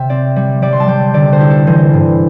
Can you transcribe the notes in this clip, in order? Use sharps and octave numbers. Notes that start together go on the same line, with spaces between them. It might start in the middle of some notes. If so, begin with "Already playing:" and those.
Already playing: C3 E5 G5
C4 D5
G3
G3 D5
C6
A5
G3 G5
D3 D5
C5
E4
A4
E3 C5
G2